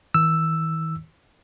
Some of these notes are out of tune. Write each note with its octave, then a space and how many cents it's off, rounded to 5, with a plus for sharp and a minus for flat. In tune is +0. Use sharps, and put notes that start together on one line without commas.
D#3 +40 E6 +5